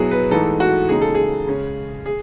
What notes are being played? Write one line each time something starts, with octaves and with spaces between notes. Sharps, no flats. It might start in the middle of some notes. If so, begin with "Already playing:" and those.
Already playing: B2 F#3 B3 E4 F#4 G#4
B4
G#2 E3 A3 D#4 A4
F#4
D#2 C#3 G#3 D#4 G#4
A4
G#4
C#3 G#3 C#4
G#4